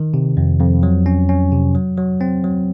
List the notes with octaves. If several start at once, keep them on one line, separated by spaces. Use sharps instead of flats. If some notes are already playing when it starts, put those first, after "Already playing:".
Already playing: D#3
C3
F2
F2
F#3
C#4
C#4
C3
F#3
F#3
C4
F#3